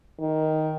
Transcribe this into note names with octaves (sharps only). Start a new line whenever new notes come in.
D#3